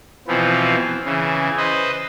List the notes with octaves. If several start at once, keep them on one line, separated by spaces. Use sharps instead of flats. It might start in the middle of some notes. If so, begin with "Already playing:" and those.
B2 E3 F3 B3 C4
C#3 E3
B4 C5 D#5